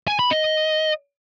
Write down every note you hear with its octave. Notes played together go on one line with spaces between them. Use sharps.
G#5
B5
D#5